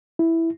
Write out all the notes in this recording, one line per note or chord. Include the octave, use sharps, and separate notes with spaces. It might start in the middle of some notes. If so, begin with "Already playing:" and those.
E4